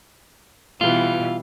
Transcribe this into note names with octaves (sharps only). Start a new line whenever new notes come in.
B2 E3 G3 F4